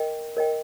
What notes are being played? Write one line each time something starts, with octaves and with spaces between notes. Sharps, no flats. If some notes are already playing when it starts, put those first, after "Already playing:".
Already playing: A#4 D#5 G5
A#4 D#5 G5